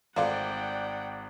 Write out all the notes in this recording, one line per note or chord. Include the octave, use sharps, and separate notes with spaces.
G#1 A3 F4 F#4 D5 F#5 G5